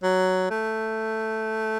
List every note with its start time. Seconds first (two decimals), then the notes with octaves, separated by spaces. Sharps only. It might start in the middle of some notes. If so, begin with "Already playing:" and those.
0.03 F#3
0.50 A3